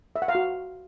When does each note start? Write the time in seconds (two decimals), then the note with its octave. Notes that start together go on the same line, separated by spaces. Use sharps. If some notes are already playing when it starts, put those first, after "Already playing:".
0.16 E5
0.22 F#5
0.28 F5
0.35 F#4